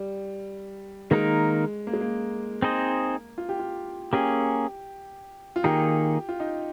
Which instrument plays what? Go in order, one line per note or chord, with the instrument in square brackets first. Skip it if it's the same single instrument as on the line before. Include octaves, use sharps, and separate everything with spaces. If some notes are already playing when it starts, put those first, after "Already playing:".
Already playing: [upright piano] G3
[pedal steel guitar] D#3 A#3 D#4 A#4 [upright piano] G#3
[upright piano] A#3
G#3
A#3
[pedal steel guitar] C4 D#4 G#4 C5 D#5
[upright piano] F4
G4
F4
[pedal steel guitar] A#3 C#4 G#4 [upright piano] G4
[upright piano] F4
[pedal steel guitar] D#3 A#3 D#4 G#4 [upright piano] G4
[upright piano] F4
D#4